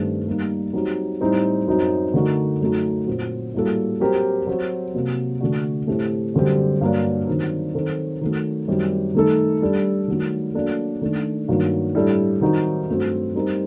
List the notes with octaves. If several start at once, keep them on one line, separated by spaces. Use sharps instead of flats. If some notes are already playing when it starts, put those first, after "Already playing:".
Already playing: G2 D#3 A3 C4 G4
G3 A#3 D#4
F#3 C4 D#4 G4
A2 G3 C4 D#4
F#2 F#3 C4 D#4
D3 A3 D#4 F#4 A#4
F#2 F#3 A3 D#4 F#4
A#2 F#3 C4
A2 G3 A#3 F#4 A4
F#3 C4 G4 A#4
F#3 C4 F#4
C3 F#3 A#3
D3 A3 D4 F#4
A2 A3 C4 G4
F#2 D3 G3 C4 G4
G2 F#3 A#3 D4
D#3 F#3 C4
D#3 F#3 C4 F#4 A4
D#3 F#3 A3
F#2 D#3 G3 C4 G4
D#3 A3 D#4 A4
G3 D4 A4
D#3 F#3 A3
F#3 A#3 D4 A4
D#3 A3 D4
G2 D#3 F#3 A#3
A2 G3 D4 A4
D#3 F#3 C4 D#4 F#4
G2 F#3 A3 C4 F#4
G3 C4 D#4 G4 A#4